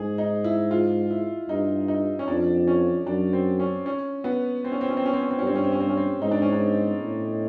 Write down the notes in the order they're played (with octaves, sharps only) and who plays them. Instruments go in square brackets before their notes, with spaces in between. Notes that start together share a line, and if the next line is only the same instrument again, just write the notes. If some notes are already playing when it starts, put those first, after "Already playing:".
Already playing: [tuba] G#2 [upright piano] G#4
[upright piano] D#4
E4
F4
E4
[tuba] G2 [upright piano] D#4
[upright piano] D#4
C#4
[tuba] F2 [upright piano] D4
[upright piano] C#4
[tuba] F#2 [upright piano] D4
[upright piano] C4
C#4
C#4
B3
C4
C#4
C4
C#4
C4
C#4
C4
C#4
C4
C#4
[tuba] G2 [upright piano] C4
[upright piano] C#4
C4
C#4
C4
C#4
C4
[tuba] G#2 [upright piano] D#4
[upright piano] D4
C#4
D4
[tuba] A2